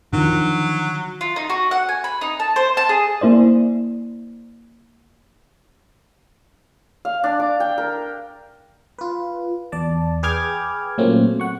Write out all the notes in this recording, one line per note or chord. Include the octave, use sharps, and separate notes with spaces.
D3 D#3 F3 F#3
F4
D#4
F#4
F#5
G#5
B5
D#4
A5
C5
A5
G#4
A#3 E4 C5 D5
F5
D4
D6
G5
A#4
F4 B4
E2 D5 A5
G#4 B4 G5 D6 F6 G#6
A#2 F#3 A3 A#3 C4 C#4
F#5 C#6